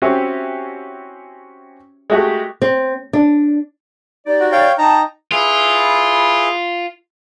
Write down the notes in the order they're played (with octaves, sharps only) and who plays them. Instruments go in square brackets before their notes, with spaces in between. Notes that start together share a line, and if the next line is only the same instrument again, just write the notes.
[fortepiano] C4 C#4 E4 F#4 G4
G#3 A3 F#4 G4
[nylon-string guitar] C4
D4
[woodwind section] D#4 G4 D5
[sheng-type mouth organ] F#4
C#5 F5 G5
[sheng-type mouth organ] D#4 A#5 [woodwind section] G5 A5
[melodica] E4 G#4 B4 [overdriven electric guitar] F4